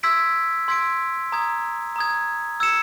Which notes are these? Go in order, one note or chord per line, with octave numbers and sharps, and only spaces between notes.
C6 E6 G#6 B6 D7
C6 E6 G#6 B6 D7
A#5 D#6 G#6
A#5 D#6 G#6
E6 G#6 C#7 E7